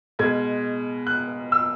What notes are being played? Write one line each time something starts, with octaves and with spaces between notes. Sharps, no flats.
B2 G#3 G#6
F#6
E6